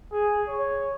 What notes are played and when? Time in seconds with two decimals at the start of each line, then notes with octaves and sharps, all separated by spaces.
0.12 G#4
0.48 C#5